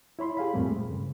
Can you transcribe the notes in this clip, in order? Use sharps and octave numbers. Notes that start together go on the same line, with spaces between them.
E4 C#5 B5 C6
G4 G#4 F5 B5
F2 A#2 G3 A3 A#3 C4
G#3
G2 C#3